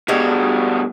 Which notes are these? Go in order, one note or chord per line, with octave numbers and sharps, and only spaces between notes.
G2 B2 G3 G#3 F#4